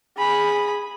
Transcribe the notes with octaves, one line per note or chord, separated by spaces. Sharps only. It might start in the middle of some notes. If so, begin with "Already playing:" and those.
G#4 B5